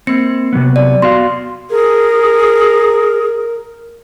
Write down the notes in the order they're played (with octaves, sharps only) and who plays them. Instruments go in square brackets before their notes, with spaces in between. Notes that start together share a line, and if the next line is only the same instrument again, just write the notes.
[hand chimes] A#3 C#7 [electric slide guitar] C4
[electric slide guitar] C3 F#3 B3
[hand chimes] D5
[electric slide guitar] B3 F#4 F5 [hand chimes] C6
[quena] G#4 [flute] A#4